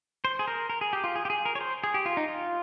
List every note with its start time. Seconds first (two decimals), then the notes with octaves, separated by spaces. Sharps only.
0.25 C5
0.39 G#4
0.48 A#4
0.70 A#4
0.81 G#4
0.93 G4
1.04 F4
1.16 G#4
1.25 G4
1.30 G#4
1.46 A#4
1.55 C#5
1.61 C5
1.84 G#4
1.94 G4
2.06 F4
2.17 D#4
2.28 F4